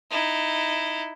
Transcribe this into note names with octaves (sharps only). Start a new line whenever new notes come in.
D#4 E4